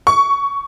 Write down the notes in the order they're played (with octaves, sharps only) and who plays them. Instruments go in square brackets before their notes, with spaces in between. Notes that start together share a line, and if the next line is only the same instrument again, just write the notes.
[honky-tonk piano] C#6